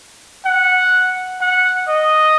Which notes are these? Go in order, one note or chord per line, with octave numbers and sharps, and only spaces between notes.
F#5
F#5
D#5